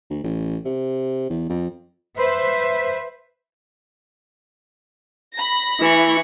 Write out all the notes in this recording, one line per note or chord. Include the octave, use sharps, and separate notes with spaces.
D2
A1
C3
E2
F2
B4 C5 E5
B5 A#6
E3 E4 C#6